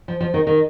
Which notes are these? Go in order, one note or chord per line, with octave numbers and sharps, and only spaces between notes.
F3
F3
D#3
D#3